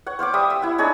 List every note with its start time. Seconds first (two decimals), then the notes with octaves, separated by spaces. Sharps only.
0.07 C#5 F#5
0.19 C5 F5 F#5 D6
0.34 G3 E5 D#6
0.50 E6
0.62 E4 F#5
0.78 D4 D#4 G#4 C#5